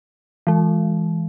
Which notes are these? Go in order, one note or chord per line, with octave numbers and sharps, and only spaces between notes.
E3 G#3